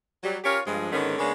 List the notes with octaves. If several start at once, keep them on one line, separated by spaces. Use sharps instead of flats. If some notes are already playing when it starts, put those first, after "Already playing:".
F#3 G3
C#4 F4 G4 A#4 C#5
G2 F3 G#3
G#2 D3 D#3 G#3 B3 C#4
C#3 G#3 A#3 B3 C#4 D4